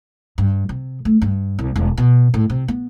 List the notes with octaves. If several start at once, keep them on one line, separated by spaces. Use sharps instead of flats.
G2
C3
A3
G2
C2
E1
B2
A2
C3
B3